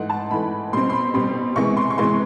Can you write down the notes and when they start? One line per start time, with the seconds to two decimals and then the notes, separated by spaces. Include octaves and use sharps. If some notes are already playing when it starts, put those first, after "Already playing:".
Already playing: G#2 E3 A3 F#5
0.09 A5
0.30 G#2 E3 A3 B5
0.73 B2 G3 C4 C6
0.90 C6
0.93 B5
1.14 B2 G3 C4 C6
1.56 C3 E3 G#3 B3 C#6
1.77 C6
1.90 C#6
1.98 C3 E3 G#3 B3 C6